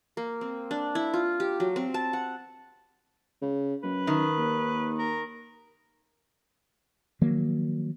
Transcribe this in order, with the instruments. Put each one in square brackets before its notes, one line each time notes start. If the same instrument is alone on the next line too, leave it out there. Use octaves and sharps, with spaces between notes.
[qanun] A#3
C4
D4
E4
F4
G4
F#3
C4
A5
F#5
[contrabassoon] C#3
[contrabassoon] F#2 [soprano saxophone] B4
[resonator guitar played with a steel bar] D#3
[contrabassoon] D#2
[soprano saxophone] A#4
[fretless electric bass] D#3 F3 F#3 A#3